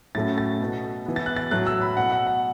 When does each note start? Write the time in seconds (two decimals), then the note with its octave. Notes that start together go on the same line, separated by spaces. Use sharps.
0.15 A2 F#3 A3 C#4 A6
0.38 A6
0.60 B2 B3
1.06 E3 B3
1.16 A6
1.26 F#6
1.36 A6
1.51 A2 F#3 A3 F#6
1.67 E6
1.82 B5
1.97 B2 B3 F#5
2.12 F#5
2.27 F#5